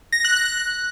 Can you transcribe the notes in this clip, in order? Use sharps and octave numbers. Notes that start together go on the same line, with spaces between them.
A#6
F#6
F#6